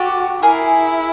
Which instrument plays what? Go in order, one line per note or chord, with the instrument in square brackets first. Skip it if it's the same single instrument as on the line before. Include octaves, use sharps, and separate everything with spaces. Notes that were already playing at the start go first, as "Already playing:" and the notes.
Already playing: [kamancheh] F#4 [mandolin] G4 A4
[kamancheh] E4 [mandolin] G#4 A#4